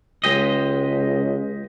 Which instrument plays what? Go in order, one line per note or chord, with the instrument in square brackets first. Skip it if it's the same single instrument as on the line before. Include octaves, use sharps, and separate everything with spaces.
[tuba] C#2 [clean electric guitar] G#3 G4 D#5